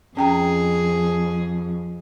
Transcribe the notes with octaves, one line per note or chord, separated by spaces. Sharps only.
F2 C#4 G#4 G5 A#5